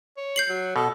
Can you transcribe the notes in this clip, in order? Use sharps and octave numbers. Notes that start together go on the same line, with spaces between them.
C#5
G6 C7 F#7
F#3
B2 A4